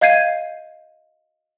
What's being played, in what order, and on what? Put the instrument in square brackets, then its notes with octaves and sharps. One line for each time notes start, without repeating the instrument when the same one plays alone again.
[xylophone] D#5 F5 G6 G#6 C7 D#7